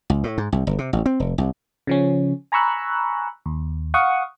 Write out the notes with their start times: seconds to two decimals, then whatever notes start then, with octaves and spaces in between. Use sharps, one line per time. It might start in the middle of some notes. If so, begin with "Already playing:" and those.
0.10 C#2
0.24 A2
0.38 G#2
0.52 C2
0.67 G1
0.79 C3
0.93 A1
1.06 C4
1.20 F1
1.38 C2
1.87 C#3 F3 C#4
2.52 G#5 A#5 B5 C#6 E6 F#6
3.46 D#2
3.94 F5 F#5 C#6 D#6